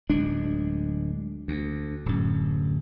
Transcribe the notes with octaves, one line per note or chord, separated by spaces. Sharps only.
D1 D2 G#3 D4
D2
D1 F#2